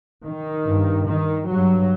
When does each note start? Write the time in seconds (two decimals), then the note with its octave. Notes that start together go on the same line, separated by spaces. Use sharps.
0.26 D#3
0.67 G2
1.08 D#3
1.48 G2 F#3